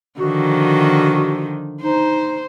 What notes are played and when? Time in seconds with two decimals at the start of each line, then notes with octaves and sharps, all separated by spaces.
0.20 D3 D#3 F3 F#4
1.82 D#4 C5